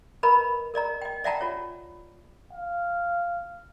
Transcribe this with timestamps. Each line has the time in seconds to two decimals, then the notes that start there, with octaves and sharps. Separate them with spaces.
0.23 A#4 B4 D#5 A#5 B5
0.74 A#4 D5 D#5 A#5
1.01 D#5 G5
1.24 D5 E5 F#5 G5 A5 A#5
1.41 F4 C#5
2.53 F5